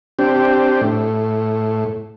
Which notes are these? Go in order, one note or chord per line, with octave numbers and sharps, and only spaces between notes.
C4 D4 G4
A2